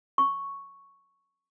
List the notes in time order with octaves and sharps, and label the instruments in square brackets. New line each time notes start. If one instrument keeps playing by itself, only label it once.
[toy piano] C#6